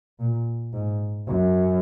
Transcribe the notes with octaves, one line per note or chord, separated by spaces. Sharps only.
A#2
G#2
F#2